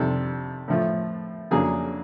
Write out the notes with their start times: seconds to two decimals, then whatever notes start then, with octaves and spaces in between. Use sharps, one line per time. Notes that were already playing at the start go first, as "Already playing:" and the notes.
Already playing: F2 C3 D#3 G3 A4
0.68 A2 F3 A3
1.51 F2 C#3 F#3 A#3 D4 G#4